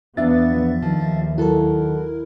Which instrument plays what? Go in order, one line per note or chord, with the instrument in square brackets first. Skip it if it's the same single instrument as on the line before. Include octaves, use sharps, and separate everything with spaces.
[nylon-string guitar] E2 D4 F4 [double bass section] B3 [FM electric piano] E5 A6
[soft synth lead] F3
[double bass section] D#2 [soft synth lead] D#3 [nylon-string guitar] F3
[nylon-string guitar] F#3 A4 [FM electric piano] E4 A#4